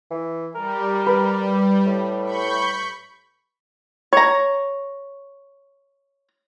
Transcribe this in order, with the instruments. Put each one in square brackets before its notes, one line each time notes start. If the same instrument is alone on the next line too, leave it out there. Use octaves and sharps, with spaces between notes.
[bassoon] E3
[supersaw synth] G3 [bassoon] A#4
[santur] B4
[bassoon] A2
[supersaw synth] B5 C#6 G6
[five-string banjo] C#5 A#5